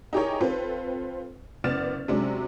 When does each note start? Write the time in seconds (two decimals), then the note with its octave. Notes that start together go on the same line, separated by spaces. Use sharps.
0.13 D#4 E4 G4 G#4 A#4 C#5
0.41 C4 F4 A4 B4 C5
1.64 F#1 B3 D5 F6 A6 E7
2.08 C3 F#3 G#3 C#4 D4